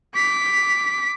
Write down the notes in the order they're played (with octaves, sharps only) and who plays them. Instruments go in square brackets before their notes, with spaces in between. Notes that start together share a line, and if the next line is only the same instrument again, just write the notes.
[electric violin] D6 B6